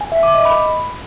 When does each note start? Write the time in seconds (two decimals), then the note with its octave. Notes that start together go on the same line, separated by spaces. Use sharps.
0.01 G#5
0.12 E5
0.23 D6
0.34 D#5
0.45 B5